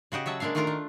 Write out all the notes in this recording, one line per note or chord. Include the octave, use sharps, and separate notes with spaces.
C#3 F#4 G4 D#5
F#3 C#5 E5 A5
G#3 A#3 D4 E5 F5
D#3 A3 D4 F4 A#4 A#5
A3